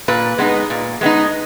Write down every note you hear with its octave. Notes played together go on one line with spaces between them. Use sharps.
A#2 B4
G#3 B3 D#4
A#2
G#3 B3 D#4